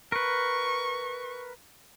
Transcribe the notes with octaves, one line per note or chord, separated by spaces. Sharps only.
A#4 B4 C#6